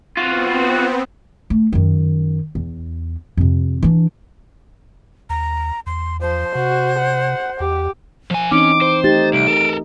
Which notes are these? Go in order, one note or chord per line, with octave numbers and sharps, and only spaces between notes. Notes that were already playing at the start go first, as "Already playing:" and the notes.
B3 C4 F4 F#4
A3
F#2 D#3
E2
F2 C3
E3 D4
D#2 A#5
E2 C6
F3 C5
C3 F#4
F#5
E2 G4
F3 G#5
E3 C4 C#4 D#4 D6
C5
A3 D#4 G4 A6
C2 D7
A4 A#4